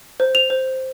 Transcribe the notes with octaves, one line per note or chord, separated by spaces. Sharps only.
C5
F7
C5